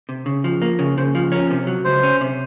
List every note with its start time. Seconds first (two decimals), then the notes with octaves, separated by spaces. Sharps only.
0.09 C3
0.26 C#3
0.44 F3
0.62 A#3
0.79 C#3 C#5
0.98 C#3 C5
1.15 F3 F4
1.32 C#4 A#4
1.50 C3
1.67 F#3
1.85 C#2 C5
2.03 C#4
2.21 C3